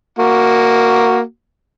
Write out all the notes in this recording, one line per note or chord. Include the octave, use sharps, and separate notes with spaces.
A#3 F#4